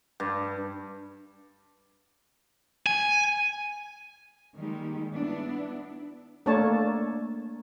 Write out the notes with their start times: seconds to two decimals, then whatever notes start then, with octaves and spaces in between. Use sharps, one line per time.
0.20 G2
2.86 G#5
4.56 D#3 G3 G#3 A#3 D#4
5.14 B3 D4 E4
6.46 A3 A#3 D4 A#4 C#5 A5